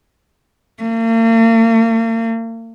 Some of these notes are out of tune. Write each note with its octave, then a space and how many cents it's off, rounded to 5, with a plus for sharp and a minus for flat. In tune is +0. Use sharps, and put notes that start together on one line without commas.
A#3 -45